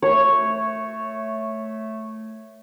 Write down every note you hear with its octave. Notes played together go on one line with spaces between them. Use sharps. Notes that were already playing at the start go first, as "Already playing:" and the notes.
A3 C#5